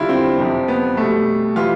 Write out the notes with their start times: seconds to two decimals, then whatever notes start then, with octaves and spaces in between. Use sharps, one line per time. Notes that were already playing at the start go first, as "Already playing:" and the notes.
Already playing: E2 D3 G3 E4 F4
0.09 C4
0.38 F2 C3 F3
0.68 B3
0.97 B2 G3 A3
1.56 E3 G3 F4